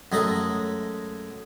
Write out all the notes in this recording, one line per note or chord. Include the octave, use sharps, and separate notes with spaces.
F#2 G#3 A3 A#5